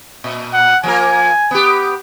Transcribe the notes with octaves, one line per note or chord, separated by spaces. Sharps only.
A#2
F#5
F3 A#3 A#4 G#5
B3 G4